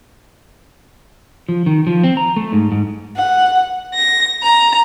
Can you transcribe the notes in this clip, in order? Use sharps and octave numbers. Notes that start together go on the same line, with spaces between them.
F3
D#3
F3
C4
A#5
A3
G#2
G#2
F#5
A#6
A#5